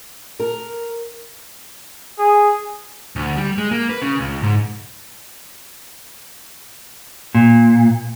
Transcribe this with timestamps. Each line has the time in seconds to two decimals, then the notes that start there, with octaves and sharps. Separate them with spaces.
0.40 A#4
2.19 G#4
3.16 D2
3.36 G3
3.58 G#3
3.71 A#3
3.89 B4
4.02 C#3
4.20 C#2
4.43 G#2
7.35 A#2